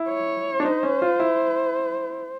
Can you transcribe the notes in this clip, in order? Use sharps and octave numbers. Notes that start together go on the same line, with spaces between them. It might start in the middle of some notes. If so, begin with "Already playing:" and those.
Already playing: E4
C#5
D4
D#4 C5
C#4
F4
E4